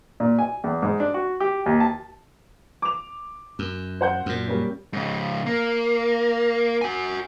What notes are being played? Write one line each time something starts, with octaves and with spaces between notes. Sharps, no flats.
A#2
G#5
E2
G#2
D4
F#4
G4
D#2
A5
D6 F7
F#2
C5 F#5 G6
F#2 A#2
G3 A#3 C#4
G#2 C#3
A#3
F#4 G#5